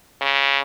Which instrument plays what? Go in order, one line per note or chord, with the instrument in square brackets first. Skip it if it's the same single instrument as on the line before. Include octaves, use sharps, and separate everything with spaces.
[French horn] C#3